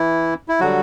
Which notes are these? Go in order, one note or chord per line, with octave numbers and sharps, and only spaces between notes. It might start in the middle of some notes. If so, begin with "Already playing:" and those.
Already playing: E3 E4
E4
D3 F#3 G3 F#4